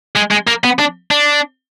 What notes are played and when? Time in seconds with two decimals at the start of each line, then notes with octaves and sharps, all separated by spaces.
0.16 G#3
0.31 G#3
0.47 A#3
0.64 B3
0.79 D4
1.11 D4